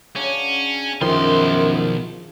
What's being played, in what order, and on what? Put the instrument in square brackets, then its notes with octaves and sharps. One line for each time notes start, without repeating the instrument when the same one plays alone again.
[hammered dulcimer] C#3 F#3 D4 [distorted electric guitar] C#4
[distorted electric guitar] B1 C6 [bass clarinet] F#2 [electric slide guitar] D#3 F3